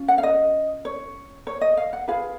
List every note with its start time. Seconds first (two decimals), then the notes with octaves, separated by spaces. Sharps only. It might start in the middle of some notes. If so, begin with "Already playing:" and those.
Already playing: C#4 F4
0.08 F#5
0.18 F5
0.23 D#5
0.85 C#5
1.47 C#5
1.61 D#5
1.77 F5
1.93 F#5
2.08 F4 G#4 B4 F5